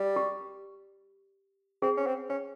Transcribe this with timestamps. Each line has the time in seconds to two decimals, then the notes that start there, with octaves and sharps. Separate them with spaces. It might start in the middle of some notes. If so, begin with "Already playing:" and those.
Already playing: G3
0.16 G4
1.82 C4 G#4
1.97 C#4
2.07 C4
2.30 C#4